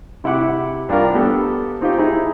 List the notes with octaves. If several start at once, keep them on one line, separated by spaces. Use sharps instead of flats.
C3 E4 G4 F#5 D6
C2 D4 F4 A#4
B3 G4 A4
C4 D#4 F4 G4
D#4 E4 G#4